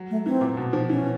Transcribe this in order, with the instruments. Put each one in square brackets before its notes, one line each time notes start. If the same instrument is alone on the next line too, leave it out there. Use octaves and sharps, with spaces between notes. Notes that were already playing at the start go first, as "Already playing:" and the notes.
Already playing: [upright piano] F#3
[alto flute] A3
[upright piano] E3 [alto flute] C4
[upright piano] A#2
B2
F3
[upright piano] E3 [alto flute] C#4